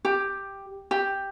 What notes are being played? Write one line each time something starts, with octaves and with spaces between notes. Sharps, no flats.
G4
G4